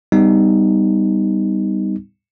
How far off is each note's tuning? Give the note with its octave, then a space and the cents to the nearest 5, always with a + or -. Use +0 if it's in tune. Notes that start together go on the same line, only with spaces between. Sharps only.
G3 +5 B3 +30 D#4 +0